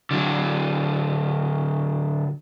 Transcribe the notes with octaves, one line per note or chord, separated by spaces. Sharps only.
D3 F#3